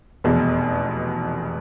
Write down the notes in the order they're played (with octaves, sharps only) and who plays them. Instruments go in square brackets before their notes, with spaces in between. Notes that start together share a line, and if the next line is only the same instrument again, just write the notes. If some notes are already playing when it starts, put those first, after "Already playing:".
[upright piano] F1 E2 B2 G#3